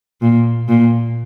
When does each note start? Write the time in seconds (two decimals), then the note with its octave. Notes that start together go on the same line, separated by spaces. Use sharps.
0.22 A#2
0.68 A#2